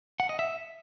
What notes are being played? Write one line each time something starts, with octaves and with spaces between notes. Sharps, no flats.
F#5
D#5
E5